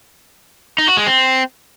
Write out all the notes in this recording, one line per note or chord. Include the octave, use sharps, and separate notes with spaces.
D#4
F#4
G#3
C4